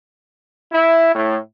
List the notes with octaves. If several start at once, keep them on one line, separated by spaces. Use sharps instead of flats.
E4
A2